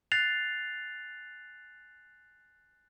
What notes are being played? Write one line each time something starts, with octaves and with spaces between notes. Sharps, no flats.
F#6 A6 C7 F7